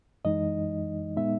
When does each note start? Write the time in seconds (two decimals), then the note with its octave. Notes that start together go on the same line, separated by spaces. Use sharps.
0.25 F#2 E3 G#3 D#4 D#5
1.16 A#2 G#3 B3 D#4 E5